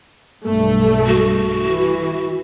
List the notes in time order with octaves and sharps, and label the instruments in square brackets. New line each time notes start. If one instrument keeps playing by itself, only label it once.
[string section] B1 G2 A3
[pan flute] F#4
[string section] E3